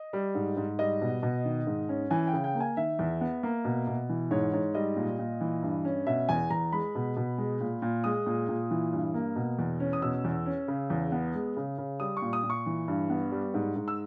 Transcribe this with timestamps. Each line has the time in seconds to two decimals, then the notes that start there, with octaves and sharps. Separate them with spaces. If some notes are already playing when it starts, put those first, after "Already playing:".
Already playing: D#5
0.13 G3
0.35 G#2
0.57 G#2
0.79 G3 D#5
1.01 B2
1.23 B2
1.45 D#3
1.67 G#2
1.89 C#4
2.11 E3 G#5
2.27 G5
2.33 C#3
2.44 G5
2.55 A#3
2.60 G#5
2.77 D#3 E5
2.99 E2
3.21 B3
3.43 A#3
3.65 B2
3.87 B2
4.09 E3
4.31 G#2 C#5
4.53 G#2 C#5
4.75 G3 D#5
4.96 A#2
5.19 A#2
5.41 E3
5.63 G2
5.85 C#4
6.06 B2 E5
6.29 E2 G#5
6.50 E2 A#5
6.72 G#3 B5
6.95 B2
7.16 B2
7.38 G#3
7.60 A#2
7.82 A#2
8.04 G#3 D#6
8.26 A#2
8.48 A#2
8.71 E3
8.93 G2
9.14 A#3
9.36 B2
9.59 E2
9.80 C#4
9.93 D#6
10.02 B2 E6
10.24 E2
10.46 C#4
10.68 C#3
10.90 E2
11.12 B3
11.34 G#3
11.57 C#3
11.78 C#3
12.00 G3 D#6
12.17 C#6
12.22 A#2
12.33 D#6
12.44 A#2
12.50 C#6
12.66 E3
12.88 G2
13.10 B3
13.32 G3
13.54 G#2
13.76 G#2
13.88 E6